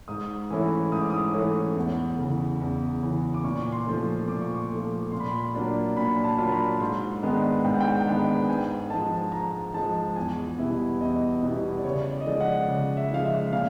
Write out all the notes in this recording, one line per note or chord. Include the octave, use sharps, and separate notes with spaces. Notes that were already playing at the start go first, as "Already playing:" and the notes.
G#2 D#6
E3 A3 C#4 E4
G#2 D#6
D6
D#6
E3 A3 C#4 E4
E2
C#3 E3
E2
C#3 E3
D6
A#2 C#6
C6
F3 A3
A#2 D6
C#6
D6
F3 A3
A#2 C6
B5
C6
F#3 A#3 D4 F4
A#2 B5
A5
F#3 A#3 D4 F4
B5
A#5
G#2 C6
D#3 G#3 B3 D4
G#2 G5
F#5
G5
D#3 G#3 B3 D4
G#2 G#5
F3 G#3 A5
G#2 A#5
F3 G#3 A5
E2 G#5
B2 G3 B3 E4
E2 D#5
B2 G3 B3 E4
D5
C#3 C#5
D5
D#5
F3 G#3 D5
F#5
C#3
E5
F3 G#3 F5
E5
A#2 F5